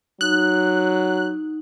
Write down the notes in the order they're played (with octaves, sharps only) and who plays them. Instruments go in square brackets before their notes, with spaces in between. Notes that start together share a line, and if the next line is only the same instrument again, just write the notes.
[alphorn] F#3 [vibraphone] D#4 [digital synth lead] F#6